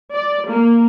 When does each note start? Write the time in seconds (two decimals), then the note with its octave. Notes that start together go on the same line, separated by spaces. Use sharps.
0.13 D5
0.51 A#3